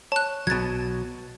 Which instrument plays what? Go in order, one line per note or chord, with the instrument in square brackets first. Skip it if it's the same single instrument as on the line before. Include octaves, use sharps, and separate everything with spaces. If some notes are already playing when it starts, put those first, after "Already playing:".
[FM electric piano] C#5 [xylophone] A5 F#6
[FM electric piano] B1 [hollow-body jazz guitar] B2 F#3 [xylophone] G#6 A6